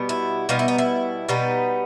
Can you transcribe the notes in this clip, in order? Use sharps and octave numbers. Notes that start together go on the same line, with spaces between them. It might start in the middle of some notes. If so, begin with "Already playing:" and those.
Already playing: B2 G3 B3
E4
B2 G3 B3 D#4 F4
E4
D#4
E4
B2 G3 B3 D#4